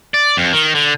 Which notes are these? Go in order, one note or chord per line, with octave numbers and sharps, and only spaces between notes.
D5
F2
D#3
D3